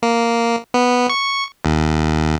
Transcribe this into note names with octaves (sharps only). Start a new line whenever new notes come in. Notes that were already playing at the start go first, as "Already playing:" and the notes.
A#3
B3
C#6
D#2